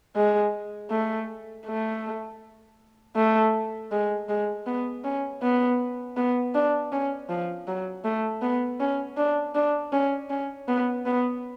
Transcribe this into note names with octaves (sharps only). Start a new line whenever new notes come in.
G#3
A3
A3
A3
G#3
G#3
B3
C#4
B3
B3
D4
C#4
F3
F#3
A3
B3
C#4
D4
D4
C#4
C#4
B3
B3